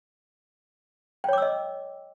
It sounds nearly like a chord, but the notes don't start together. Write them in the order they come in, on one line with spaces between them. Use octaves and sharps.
G5 C#5 D6 E6 D#5